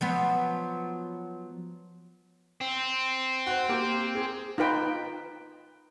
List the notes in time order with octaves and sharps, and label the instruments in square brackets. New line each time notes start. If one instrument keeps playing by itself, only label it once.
[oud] F3 F#3 B3
[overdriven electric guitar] C4
[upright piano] F#4 C5
A#3 G4
G#4
[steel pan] D#4 F4 B4 G5